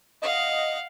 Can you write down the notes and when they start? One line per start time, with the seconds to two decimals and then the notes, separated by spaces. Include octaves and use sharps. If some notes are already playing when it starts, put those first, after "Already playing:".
0.22 D#5 F5 F#5